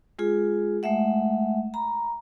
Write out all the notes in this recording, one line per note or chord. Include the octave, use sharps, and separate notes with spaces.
G#3 F4 G#4
G#3 A3 E5 F#5
A#5 B5